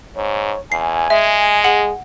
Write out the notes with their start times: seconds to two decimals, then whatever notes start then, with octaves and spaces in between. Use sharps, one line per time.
0.16 G#2 C#5
0.72 E2 G#5 C7
1.10 G#3 E5
1.64 G#4 F#5 F#7